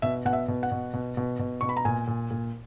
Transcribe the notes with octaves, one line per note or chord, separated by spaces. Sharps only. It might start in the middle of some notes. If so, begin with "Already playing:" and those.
B2 E5
B2 F#5
E5
B2
F#5
B2
B2
B2
B2
B2 C#6
B5
A#5
A#2 G#5
A#2
A#2